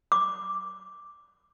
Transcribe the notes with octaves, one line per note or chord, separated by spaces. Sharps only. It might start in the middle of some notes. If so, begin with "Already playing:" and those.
D6